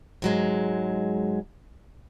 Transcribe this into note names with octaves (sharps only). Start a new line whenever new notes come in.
G#2 F#3 G#3